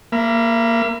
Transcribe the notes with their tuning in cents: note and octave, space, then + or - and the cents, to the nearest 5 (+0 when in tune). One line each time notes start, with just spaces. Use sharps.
A#3 +0 E5 +45 B5 +0